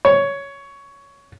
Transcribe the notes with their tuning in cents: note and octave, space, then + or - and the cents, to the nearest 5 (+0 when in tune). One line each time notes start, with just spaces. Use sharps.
C#5 +10